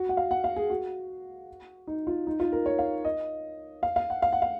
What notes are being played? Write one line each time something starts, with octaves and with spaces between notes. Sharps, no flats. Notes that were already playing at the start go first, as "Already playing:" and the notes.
Already playing: F#4
F#5
F5
F#5
F5
G#4
F#4
D#4
F4
D#4
F4
A#4
C#5
F5
D#5
F5
F5
F#5
F5
F#5
F5